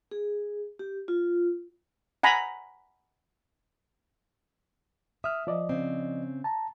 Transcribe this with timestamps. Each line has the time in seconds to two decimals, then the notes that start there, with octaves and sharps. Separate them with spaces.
0.11 G#4
0.79 G4
1.08 F4
2.23 F#5 G#5 A#5 B5
5.24 E5 D#6 F6
5.47 F3 D5 D#5
5.69 C#3 C4
6.44 A5 A#5